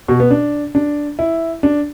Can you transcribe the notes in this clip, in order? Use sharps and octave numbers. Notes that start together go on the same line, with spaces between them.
B2
B3
D4
D4
E4
D4